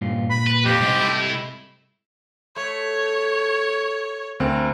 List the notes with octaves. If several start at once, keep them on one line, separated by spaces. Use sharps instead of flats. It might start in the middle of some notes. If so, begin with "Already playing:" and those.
G2 A#2 F4
A#2 B5
B4
F2 G4
G#2 C3 G3 D#5
A3 E4
A3 C#5
D2 C4 A#4